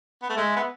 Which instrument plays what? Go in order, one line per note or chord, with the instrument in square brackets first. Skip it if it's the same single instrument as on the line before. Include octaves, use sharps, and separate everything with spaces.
[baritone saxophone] B3
A3
[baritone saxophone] G#3 [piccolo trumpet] E5
[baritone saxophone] B3